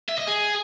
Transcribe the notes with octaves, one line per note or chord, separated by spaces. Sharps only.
E5
D#5
G#4